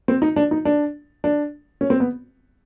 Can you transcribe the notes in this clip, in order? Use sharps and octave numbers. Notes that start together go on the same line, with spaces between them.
C4
D#4
D4
D#4
D4
D4
C#4
C4
B3